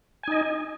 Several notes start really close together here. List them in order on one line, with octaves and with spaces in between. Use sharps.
G#5 D#4 D#5